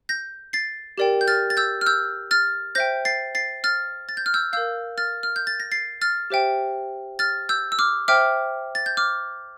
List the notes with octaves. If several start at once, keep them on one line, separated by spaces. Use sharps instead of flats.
G6 A#6
A6 C7
G4 A#4 D5 G5
G6
F6 A6
A6
E6 G6
F6
E6 G6
F6 A6
C5 E5 G5 G6 A#6
A6 C7
A6 C7
F6 A6
A6
G6
F6
E6 G6
A#4 F5 E6 G6
F6 A6
F6
G6
A6
A#6
A6 C7
F6 A6
G4 C5 E5 G5
F6 A6
E6 G6
E6
D6 F6
C5 E5 G5 D6 F6
A6
G6
D6 F6